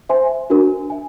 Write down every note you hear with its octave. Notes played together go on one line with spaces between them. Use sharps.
C5 E5 G#5 C6
D4 F#4 A#4
E5 G#5